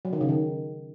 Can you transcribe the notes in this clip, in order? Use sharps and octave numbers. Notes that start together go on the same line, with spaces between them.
F#3
D#3
C#3
D#3